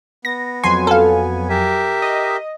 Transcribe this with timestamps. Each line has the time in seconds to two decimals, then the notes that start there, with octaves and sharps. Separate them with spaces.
0.25 B3 A#6
0.64 F2 F#3 G#5 C6
0.87 A4 F5
1.49 G4 A#4 E5
2.02 D#5